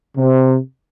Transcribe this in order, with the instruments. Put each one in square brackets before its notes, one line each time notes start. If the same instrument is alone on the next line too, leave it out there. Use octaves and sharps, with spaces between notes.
[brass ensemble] C3